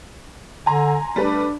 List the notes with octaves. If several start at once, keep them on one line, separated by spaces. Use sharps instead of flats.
D3 G#5 A#5 C6
G3 A3 D4 B4